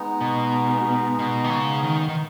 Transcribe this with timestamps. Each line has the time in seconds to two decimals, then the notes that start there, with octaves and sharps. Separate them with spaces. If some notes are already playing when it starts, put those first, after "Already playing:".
Already playing: G#3 B3 D#4
0.21 B2
1.19 B2
1.44 D#3
1.50 C#3
1.83 D#3
2.09 D#3